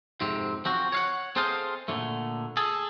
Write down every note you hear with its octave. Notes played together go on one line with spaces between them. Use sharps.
F2 G#2 C3 C4
F3 C4 F#4
C#5 F5 F#5
C4 G#4 A4 C5 D#5 F5
A#2 D3 F3 A3
G#4 A4